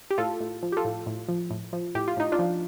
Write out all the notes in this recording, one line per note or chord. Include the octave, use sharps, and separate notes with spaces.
G4
A2 F4 A4
A2
F3
G4
F4 A4
A2
A2
F3
A2
F3
A2 G4
F4
A2 D#4
D4 F4
F3